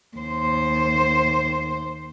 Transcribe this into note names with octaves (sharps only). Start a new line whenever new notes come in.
D#2 C5